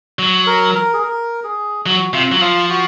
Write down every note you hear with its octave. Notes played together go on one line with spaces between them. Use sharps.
F#3
A#4
A#4
G#4
A#4
G#4
F#3 F#4
C3 F4
F#3
F3 F4
F#4